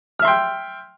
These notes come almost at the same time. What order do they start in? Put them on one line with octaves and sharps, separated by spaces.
F6 E5 C6 G5